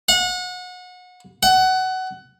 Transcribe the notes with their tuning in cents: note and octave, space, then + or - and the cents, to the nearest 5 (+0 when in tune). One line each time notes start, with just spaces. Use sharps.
F#5 -30
F#5 +20